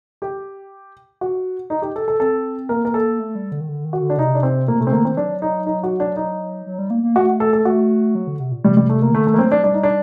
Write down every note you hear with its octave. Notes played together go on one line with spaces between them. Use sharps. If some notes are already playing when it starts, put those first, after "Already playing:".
G4
F#4
D#4
G4
A4
A4
C4 A4
A#3 A#4
A#4
A4
A3
G3
D3
D#3
D3
D#3
F#4
D3
D4
C3 D#4
D4
C4
A#2 A#3
C3 A3
C4
D3 A#3
D#3 C4
F#3 D4
D#4
D#4
F#4
D4
D#4
F#3
G3
A#3
A#3
A3 F#4
A4
A4
A3 F#4
F#3
D3
C3
A#2
C3 G3
G3
A3
A#3
D#3
D3 A3
D#3 A3
A#3
F#3 C4
F#3 D4
G3 D4
D#4
D4